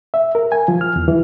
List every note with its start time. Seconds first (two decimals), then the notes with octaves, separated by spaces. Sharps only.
0.14 E5
0.35 A#4
0.52 G#5
0.68 F3
0.81 F6
0.96 E2
1.08 E3